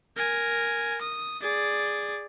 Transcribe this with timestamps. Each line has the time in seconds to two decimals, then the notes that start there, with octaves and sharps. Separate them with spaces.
0.17 A#4 G#5
1.02 D#6
1.42 G#4 D5